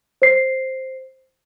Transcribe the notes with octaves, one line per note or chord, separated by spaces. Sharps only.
C5 C7